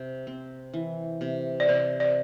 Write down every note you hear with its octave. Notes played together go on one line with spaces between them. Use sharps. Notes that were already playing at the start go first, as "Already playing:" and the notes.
Already playing: C3
C4
E3
C3
D5
C3 C5
D5